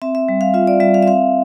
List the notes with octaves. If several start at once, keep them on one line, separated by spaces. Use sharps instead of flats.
C4 E5
E5
G3
F5
F4 E5
D5
G3 E5
F5
E5
C4 F5